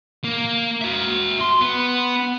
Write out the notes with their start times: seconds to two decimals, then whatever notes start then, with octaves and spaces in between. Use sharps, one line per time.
0.24 A#3
0.81 F#4 E5
1.41 C6
1.61 B3